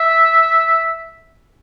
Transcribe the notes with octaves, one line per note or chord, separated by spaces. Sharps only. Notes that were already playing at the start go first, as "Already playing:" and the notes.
Already playing: E5